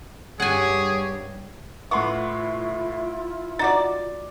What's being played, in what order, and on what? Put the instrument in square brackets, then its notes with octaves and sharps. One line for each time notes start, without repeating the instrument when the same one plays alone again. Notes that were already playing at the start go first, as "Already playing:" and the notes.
[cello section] G2 [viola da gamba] G4 C#5 [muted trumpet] G#4 [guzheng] F#5 G#5
[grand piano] A2 C6 C#6 [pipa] B3 [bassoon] E4 [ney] F4
[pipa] D#4 F#4 D5 [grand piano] D6 A6